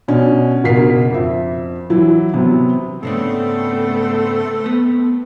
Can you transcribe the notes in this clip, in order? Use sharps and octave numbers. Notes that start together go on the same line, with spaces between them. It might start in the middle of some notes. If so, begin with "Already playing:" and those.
B2 C#4 D4
F#1 B2 A#4 B6 C7
F2 E5
E3 F#3 E4
C3 F#3 B3
G#2 C#3 A3 B3 C4 D4 A4
B3